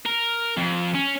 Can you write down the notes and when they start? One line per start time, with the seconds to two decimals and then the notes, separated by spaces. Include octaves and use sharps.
0.06 A#4
0.57 F2
0.95 C#4